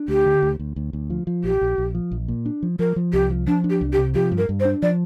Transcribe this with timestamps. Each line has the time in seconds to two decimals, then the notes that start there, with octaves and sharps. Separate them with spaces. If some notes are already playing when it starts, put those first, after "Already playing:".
Already playing: D4
0.08 D2 G4
0.25 D3
0.43 D2
0.59 D2
0.76 D2
0.93 D2
1.10 F3
1.27 F3
1.44 A#1 G4
1.61 A#1
1.78 A#1
1.95 F3
2.11 A#1
2.28 A#2
2.46 D4
2.63 F3
2.79 F3 A#4
2.96 F3
3.13 C2 G4
3.30 F3
3.47 F3 D4
3.64 D4
3.70 G4
3.81 C2
3.93 G4
3.98 C3
4.14 F3 G4
4.32 G2
4.38 A#4
4.49 G2
4.60 C5
4.65 D4
4.82 F3 D5